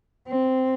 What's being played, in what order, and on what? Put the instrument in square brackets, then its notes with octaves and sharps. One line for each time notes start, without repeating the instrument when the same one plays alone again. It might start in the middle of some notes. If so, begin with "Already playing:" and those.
[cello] C4